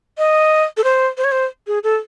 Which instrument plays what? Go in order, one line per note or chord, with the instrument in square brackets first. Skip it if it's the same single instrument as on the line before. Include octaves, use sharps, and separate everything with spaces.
[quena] D#5
A4
C5
C5
C#5
C5
G#4
A4